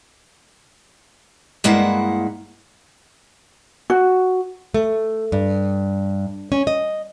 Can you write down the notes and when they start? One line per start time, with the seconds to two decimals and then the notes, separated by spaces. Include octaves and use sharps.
1.64 G2 G#3 A#3 E4 F#5
3.90 F#4
4.74 A3
5.32 G2
6.52 C#4
6.67 D#5